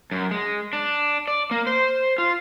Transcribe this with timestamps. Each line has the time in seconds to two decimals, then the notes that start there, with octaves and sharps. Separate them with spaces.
0.11 F#2
0.31 G#3
0.73 D4
1.28 D5
1.51 A#3
1.67 C5
2.18 F4